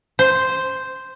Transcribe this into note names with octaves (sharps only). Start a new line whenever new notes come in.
C5